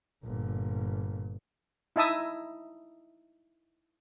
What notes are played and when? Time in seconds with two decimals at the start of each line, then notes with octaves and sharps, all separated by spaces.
0.24 G1 A#2
1.96 D#4 E4 E5 A5 D#6